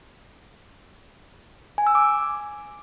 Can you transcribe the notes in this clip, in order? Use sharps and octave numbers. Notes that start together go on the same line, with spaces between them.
G#5
E6
D6